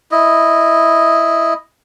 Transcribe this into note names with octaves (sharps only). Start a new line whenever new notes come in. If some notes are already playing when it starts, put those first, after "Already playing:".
E4 D#5